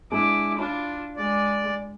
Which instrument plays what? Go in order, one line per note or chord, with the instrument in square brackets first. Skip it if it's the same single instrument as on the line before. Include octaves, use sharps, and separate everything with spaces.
[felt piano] G#3 D4 [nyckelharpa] E4 D6
[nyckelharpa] D4 F4 [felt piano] B5
[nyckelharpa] G#3 [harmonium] D5